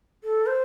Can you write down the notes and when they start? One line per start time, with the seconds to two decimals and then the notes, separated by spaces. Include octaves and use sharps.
0.24 A4
0.47 C5